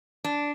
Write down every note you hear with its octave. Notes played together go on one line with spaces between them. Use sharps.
D4